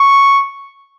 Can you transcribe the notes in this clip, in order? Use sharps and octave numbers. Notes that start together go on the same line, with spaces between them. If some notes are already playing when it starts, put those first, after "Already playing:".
Already playing: C#6